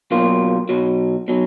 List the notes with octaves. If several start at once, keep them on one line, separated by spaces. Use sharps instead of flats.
B2 F#3 A#3 F4
B1 B2 F#3
B2 F#3